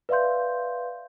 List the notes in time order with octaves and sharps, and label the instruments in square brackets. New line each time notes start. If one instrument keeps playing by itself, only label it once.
[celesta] B4 D5 E5 F5 C6 G6